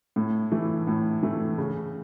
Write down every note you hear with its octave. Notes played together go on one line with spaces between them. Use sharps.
A2
E3 A3
A2
E3 A3
C#3